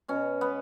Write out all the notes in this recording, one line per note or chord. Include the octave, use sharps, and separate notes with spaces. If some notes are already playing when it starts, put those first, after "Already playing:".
B2 C#4
G#3 B3